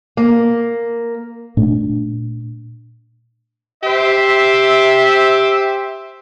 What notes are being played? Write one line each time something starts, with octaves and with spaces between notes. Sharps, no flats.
A#3
A#2 A3 D4
G4 C5 E5